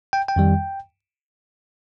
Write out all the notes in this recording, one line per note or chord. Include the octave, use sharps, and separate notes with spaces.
G5
G5
F2 D#3 G3